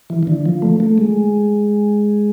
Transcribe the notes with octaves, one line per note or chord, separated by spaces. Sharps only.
E3
E3
D3
F3
A3
A3
G#3